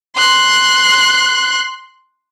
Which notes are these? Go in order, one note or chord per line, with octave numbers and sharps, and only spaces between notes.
C6 F#6